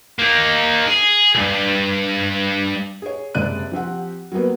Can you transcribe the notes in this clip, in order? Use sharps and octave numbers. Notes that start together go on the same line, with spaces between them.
A#3 D#4
G#4
C2 G2
G#4 C#5
F#1 C3 G#3 D5 F#6 D#7
F3 C4 G4 F#5
F#3 G3 A#3 B3